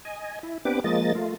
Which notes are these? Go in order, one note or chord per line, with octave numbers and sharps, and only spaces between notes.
D#5 G#5
E4
B3 C4 D4 G4 B4 D6
F3 G#3 A#3 D#5 A6
A3 F4